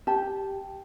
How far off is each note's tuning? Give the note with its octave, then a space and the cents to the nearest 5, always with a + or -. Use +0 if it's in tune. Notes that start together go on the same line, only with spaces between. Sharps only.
G4 +0 A5 -15